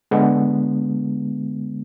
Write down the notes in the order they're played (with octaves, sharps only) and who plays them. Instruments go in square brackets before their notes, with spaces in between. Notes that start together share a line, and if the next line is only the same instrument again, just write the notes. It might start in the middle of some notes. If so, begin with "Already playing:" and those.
[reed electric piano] D3 G#3 B3